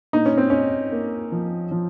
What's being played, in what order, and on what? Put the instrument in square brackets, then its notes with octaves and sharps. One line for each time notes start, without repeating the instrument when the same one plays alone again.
[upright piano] A#2 [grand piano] D#4
[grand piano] C#4
C4
[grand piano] C#4 [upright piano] D#4
[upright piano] A#3
F3
F3